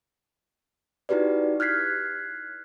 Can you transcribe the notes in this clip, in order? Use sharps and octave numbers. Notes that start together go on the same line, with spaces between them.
D#4 E4 F#4 G4 B4 D5
F6 F#6 G#6 B6 C7